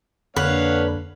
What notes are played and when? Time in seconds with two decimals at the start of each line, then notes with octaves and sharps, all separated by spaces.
0.36 F2 D3 A#3 D4 B4 C#5 F5 F#5